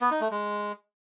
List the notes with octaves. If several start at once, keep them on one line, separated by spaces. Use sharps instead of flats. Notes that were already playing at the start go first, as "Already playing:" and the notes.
B3
D#4
A3
G#3